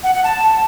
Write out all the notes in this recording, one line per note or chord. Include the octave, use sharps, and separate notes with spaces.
F#5
F#5
A5